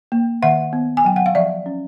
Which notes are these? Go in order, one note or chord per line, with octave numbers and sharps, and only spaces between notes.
A#3
D#3 E5 F#5
B3
G#5
F#3 G5
F#5
F5
F3 D5 E5
C#4